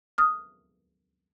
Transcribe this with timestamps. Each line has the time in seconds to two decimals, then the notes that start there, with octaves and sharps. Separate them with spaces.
0.18 D#6 F6